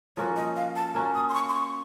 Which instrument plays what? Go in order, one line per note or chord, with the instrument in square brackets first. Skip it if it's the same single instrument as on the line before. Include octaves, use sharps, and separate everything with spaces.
[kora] F3 A#3 C#4 F#4 [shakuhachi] C#5
[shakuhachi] D#5
F5
A5
[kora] A#3 C#4 F#4 [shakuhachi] A#5
[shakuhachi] D#6
C6
C#6
C6
C#6